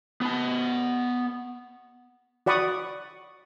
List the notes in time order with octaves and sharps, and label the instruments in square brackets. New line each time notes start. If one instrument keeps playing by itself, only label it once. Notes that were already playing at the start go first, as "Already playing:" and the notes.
[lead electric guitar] B3 A5
[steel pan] F#4 D5 F#5 B5 C#6 D#6